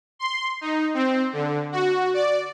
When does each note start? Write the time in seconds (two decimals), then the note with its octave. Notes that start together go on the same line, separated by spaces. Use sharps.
0.19 C6
0.61 D#4
0.94 C4
1.33 D3
1.72 F#4
2.14 D5